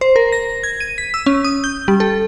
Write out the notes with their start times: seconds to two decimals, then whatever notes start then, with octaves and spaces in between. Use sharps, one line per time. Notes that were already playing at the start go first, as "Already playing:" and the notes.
0.01 C5
0.16 A#4
0.32 A#6
0.64 G#6
0.80 D#7
0.98 B6
1.14 E6
1.26 C#4
1.44 D#6
1.64 G6
1.88 G3
2.00 A4